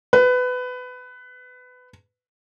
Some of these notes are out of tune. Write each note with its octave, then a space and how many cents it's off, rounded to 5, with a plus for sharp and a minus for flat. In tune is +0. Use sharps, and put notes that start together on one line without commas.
B4 +20